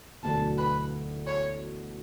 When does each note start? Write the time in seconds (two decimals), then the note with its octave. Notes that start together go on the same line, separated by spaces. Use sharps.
0.23 E1 D2 D3 F#3 A5
0.58 B4
1.27 C#5